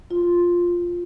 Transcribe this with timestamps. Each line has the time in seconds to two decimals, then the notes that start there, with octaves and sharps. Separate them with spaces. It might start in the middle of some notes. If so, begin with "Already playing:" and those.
0.11 F4